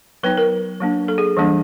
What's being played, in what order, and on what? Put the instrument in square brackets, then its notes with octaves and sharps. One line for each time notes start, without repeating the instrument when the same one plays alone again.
[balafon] F#3 B3 D#4 B4
A#4
F#3 A#3 D4
A4
G#4
E3 G3 A#3 D4